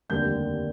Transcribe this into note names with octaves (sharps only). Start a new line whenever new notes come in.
F1 D#2 D3 G3 A#3 G6